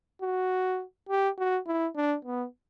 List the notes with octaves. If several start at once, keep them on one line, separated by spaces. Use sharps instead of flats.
F#4
G4
F#4
E4
D4
B3